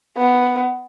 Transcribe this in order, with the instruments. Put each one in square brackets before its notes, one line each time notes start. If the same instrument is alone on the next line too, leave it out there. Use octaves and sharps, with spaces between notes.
[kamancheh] B3